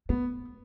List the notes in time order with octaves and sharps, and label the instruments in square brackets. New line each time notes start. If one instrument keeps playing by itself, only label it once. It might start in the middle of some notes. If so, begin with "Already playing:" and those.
[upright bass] A3 [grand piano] B3